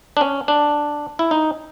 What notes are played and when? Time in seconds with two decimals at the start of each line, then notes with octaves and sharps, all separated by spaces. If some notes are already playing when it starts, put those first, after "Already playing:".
0.17 D4
0.21 C#4
0.48 D4
1.19 E4
1.31 D#4